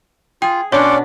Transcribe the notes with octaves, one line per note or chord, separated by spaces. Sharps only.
F4 G#4 G5
B2 C#4 D4 C#5 D5 F#5 C6 D6